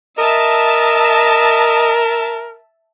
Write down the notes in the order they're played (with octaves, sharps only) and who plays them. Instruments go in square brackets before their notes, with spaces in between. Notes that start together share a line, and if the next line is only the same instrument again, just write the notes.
[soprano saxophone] A#4 [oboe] D#5 [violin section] E5 A5 E6